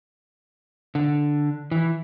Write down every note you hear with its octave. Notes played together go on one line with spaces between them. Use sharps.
D3
E3